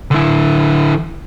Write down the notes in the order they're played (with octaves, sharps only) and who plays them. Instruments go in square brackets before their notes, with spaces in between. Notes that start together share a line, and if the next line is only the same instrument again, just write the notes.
[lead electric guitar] D3 E4